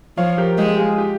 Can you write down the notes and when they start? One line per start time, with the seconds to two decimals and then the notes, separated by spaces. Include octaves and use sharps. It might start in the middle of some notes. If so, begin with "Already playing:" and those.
0.17 F3 C#5 F5
0.38 G4 A#4
0.58 G#3 G4
0.78 F4 G#4
0.98 G4